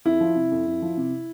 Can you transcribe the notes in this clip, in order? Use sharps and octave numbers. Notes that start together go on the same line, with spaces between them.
F2 E4
F3
C3
F2
F2
F3
C3